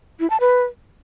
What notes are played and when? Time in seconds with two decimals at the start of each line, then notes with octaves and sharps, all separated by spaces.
0.20 E4
0.30 A5
0.40 B4